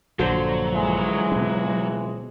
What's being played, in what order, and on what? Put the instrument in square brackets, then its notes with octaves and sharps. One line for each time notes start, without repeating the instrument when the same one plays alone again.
[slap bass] A#1 G2 A#2 [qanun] D3 C5 [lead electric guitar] F#3
[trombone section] C#2 E3 G#3
[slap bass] B2 C4